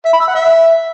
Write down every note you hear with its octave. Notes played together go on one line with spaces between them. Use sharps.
E5
B5
E6
F#5
E5